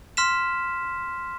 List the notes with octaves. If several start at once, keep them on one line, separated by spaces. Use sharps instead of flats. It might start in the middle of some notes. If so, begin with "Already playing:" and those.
C6 F6 B6 E7